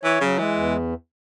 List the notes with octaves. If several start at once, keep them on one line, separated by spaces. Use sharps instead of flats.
E3 C#5
C#3 F#3
E3 G#3
E2